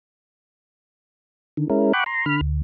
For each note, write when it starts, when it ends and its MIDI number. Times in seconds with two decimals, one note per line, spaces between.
1.57 1.68 50
1.57 1.68 51
1.70 1.92 56
1.70 1.92 61
1.70 1.92 64
1.70 1.92 70
1.93 2.04 78
1.93 2.04 79
1.93 2.04 83
1.93 2.04 85
1.93 2.04 86
1.93 2.04 90
2.06 2.25 82
2.06 2.25 84
2.26 2.41 50
2.26 2.41 83
2.26 2.41 89
2.41 2.62 38